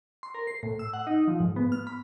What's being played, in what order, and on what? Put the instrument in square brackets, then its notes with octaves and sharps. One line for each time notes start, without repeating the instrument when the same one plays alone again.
[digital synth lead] C6
A#4
C7
A2
E6
F#5
D#4
F3
G#2
B3
F6
B5